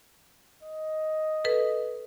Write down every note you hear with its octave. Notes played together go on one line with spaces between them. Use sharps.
D#5
A4 B4